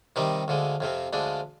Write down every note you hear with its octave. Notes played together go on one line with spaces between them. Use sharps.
C3 D#3 G3 C4 D#4
D2 D3 F3 G#3
F2 C3 F3 C4
D2 D3 F3 G#3 D4